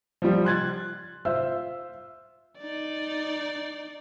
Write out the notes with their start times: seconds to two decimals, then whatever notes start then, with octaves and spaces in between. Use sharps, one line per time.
0.22 F3 G3
0.45 C6 F#6 G#6 A6
1.25 F4 C5 E5 E6
2.59 D#4 D5